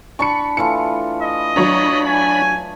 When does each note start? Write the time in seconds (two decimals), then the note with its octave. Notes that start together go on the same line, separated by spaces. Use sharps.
0.19 D4 A5 B5 C#6 C#7
0.57 E3 A3 F4 C#7
1.22 D#5
1.56 F#3 D4 C#5 A#5 B5
2.07 G#5